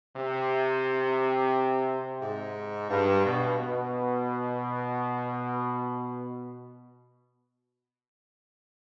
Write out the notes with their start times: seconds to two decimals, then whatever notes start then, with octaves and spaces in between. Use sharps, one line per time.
0.16 C3
2.22 G#2
2.90 G2
3.25 B2
3.59 B2